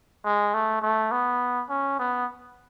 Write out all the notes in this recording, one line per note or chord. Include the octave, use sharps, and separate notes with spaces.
G#3
A3
A3
B3
C#4
B3